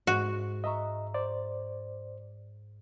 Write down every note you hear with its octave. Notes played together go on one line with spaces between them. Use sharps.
G#2 F#4
D#5 E5 A#5 C#6
C5 D5